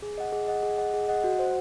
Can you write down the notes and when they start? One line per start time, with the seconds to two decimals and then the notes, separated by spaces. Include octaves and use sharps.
0.02 G#4
0.18 D#5 F#5
0.33 G#4
0.48 D#5 F#5
0.63 G#4
0.78 D#5 F#5
0.94 G#4
1.09 D#5 F#5
1.24 F#4
1.39 C5 F#5